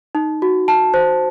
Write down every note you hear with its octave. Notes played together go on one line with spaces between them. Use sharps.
D#4
F#4
A5
C5